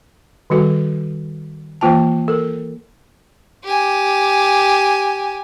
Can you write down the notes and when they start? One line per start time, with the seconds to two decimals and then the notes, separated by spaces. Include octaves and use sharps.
0.50 D#3 G3 F#4 A4
1.81 E3 A#3 F4 G5 A5
2.28 A4 A#4
3.64 G4 G#5